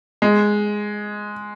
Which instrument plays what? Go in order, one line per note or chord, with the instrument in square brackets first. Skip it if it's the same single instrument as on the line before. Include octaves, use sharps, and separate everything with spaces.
[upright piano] G#3